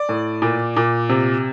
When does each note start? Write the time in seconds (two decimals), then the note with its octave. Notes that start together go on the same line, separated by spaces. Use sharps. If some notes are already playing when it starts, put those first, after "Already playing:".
Already playing: D5
0.09 A2
0.42 A#2
0.77 A#2
1.09 C3